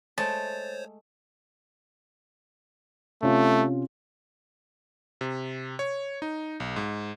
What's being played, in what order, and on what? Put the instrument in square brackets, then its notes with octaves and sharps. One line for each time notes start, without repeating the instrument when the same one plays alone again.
[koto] G#3 A3 [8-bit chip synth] C5 C#5 [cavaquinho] A5
[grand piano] C3 C#4 F4 [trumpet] A3
[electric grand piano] C3
C#5
D#4
B1
G#2